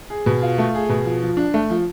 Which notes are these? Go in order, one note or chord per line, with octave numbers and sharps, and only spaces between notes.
G#4
B2
F4
A3
G#4
B2
F3
F3
D4
A3
F3